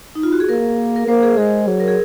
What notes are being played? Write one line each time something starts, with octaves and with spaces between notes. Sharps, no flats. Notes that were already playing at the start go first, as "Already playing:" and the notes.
D#4
F4
F#4
G#4
A#3 A#4
A#4
A#3 C5
G#4
G#3 G#4
F#3
A#4
G#4